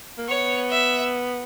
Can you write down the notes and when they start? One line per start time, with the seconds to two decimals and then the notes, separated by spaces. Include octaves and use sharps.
0.18 A#3
0.28 B3 C#5
0.71 E5